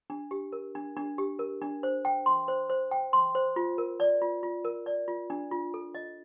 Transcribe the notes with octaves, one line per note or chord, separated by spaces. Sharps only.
D4
G4
A#4
D4
D4
G4
A#4
D4
C5
G5
C6
C5
C5
G5
C6
C5
F4
A#4
D5
F4
F4
A#4
D5
F4
D4
F4
A4
D#5